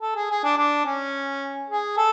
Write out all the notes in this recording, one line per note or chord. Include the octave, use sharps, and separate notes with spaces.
A4
G#4
G#4
D4
D4
C#4
G#4
A4